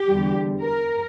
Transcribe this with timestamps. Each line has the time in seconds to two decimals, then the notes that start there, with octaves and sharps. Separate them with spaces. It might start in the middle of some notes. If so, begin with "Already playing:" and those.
Already playing: G4
0.08 E2 D3 G3
0.63 A#4